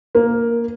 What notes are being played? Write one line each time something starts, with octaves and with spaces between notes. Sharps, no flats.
A#3